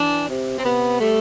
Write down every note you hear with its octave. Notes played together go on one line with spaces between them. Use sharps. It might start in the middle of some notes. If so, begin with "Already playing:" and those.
Already playing: E3 D4
C3
C4
C3 B3
G3 A3